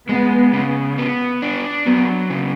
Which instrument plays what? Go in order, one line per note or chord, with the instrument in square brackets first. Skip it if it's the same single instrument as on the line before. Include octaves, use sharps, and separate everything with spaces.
[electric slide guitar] G#3 [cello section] B3
[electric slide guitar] C#3
B3
D4
[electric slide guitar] F#3 [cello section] B3
[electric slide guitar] C#3